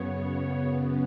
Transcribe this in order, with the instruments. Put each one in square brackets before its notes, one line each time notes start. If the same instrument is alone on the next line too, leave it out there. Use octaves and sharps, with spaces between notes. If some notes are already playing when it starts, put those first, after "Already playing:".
Already playing: [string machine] F#2 C#3 B3 C#5